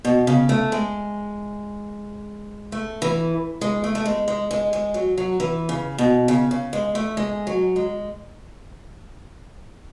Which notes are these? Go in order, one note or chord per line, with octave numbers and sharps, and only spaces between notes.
B2
C#3
A3
G#3
A3
E3
G#3
A3
A3
G#3
G#3
G#3
G#3
F#3
F#3
E3
C#3
B2
C#3
C#3
G#3
A3
G#3
F#3
G#3